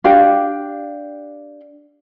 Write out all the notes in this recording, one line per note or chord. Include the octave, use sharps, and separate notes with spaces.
D4 G4 F5 G5